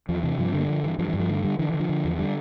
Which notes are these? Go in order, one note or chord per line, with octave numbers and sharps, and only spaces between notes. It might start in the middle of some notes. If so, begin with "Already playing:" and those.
E2 F3
C3 E3
G2 F3
C4
D3
A#3
G2 F3
G2 E3
G2 F3
E3
G2
F3
D3 A3
D3 G3
D3 E3
E3
D3
F3
D3
E2
D3 G3